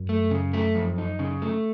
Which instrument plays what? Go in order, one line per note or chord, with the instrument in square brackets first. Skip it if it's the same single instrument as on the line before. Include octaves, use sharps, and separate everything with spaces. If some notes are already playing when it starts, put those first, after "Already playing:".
Already playing: [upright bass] F#2
[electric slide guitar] A3
C#3
A3
F2
D#4
C#3
A3